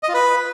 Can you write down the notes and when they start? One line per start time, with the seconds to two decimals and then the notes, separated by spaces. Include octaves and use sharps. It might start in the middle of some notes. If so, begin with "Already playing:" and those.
0.03 D#5
0.09 F4
0.14 B4